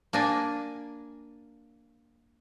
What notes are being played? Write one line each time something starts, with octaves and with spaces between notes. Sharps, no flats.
A#3 D4 G#5